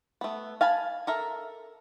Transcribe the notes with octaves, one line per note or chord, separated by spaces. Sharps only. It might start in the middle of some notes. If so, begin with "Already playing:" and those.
A3 B3
F5 G#5 A5 B5
A4 A#4 E5